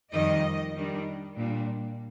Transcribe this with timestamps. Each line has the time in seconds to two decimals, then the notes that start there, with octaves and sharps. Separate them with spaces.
0.13 F2 D#3 G3 D#5
0.76 D#3 G3 D4
1.37 A#2 G3 D4